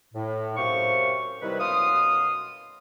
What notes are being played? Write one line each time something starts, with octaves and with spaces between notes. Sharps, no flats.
A2
F#2 C3 C5 F5 C#6
C3 D#3 G3 E4 B4
F#2 B2 F5 C6 D#6